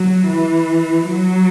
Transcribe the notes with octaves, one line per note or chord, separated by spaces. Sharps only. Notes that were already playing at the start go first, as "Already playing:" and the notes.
Already playing: F#3
E3
F#3